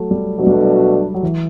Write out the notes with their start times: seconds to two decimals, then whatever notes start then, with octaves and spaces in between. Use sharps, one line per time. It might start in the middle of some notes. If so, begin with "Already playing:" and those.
Already playing: F#3 A3
0.11 G3
0.38 B2 F#3 A3 D4 F#4
0.47 G3
0.54 F#3
1.14 F#3
1.23 E3